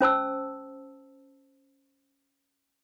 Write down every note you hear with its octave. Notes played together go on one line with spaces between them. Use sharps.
C#4 C5 A5 E6